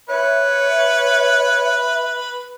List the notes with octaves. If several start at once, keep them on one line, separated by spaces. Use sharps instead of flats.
B4 C#5 E5